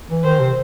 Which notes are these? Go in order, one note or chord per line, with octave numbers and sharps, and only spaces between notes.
E3
D#3 C5
C3